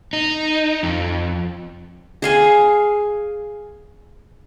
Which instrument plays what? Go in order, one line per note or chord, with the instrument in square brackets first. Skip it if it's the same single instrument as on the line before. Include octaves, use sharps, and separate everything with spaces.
[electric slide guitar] D#4
F2
[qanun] G#4 F5 G#5